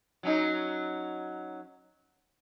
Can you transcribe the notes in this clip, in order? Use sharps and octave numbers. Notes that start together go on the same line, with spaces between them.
F#3 C#4 D#4